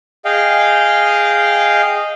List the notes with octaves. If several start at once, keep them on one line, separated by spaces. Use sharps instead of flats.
G#4 D#5 F5 G5